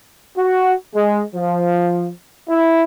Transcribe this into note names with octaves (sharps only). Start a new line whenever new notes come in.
F#4
G#3
F3
E4